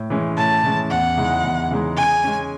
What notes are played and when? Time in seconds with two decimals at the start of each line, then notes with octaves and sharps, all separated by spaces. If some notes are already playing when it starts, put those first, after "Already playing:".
Already playing: A2
0.10 E3 G#3 C#4
0.37 A2 A5
0.64 E3 G#3 C#4
0.91 E2 F#5
1.17 C#3 E3 G#3 D#4
1.44 E2
1.71 C#3 E3 G#3 D#4
1.97 C#3 G#5
2.24 G#3 C#4